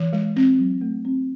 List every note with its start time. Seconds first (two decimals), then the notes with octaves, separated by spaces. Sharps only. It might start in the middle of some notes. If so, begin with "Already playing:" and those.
Already playing: E3
0.13 G#3
0.36 C4
0.59 F#3
0.81 A3
1.05 C4